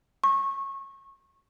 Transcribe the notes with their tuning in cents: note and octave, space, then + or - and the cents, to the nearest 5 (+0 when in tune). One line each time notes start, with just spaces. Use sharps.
C#6 -25